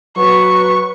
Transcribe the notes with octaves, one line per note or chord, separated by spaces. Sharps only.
F#3 B4 C#6